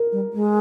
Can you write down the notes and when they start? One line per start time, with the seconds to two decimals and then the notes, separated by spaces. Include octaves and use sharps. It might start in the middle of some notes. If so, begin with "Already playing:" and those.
Already playing: A#4
0.12 G3
0.33 G#3